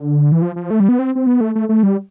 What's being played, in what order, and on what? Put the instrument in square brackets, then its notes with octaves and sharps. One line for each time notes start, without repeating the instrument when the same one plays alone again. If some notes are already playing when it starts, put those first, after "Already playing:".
Already playing: [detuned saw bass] D3
E3
F3
F3
A3
G3
B3
C4
C4
B3
A3
A3
A3
G3